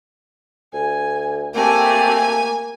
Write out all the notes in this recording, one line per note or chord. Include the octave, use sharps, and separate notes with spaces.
D2 G#5
A3 A#3 C4 G4 G#5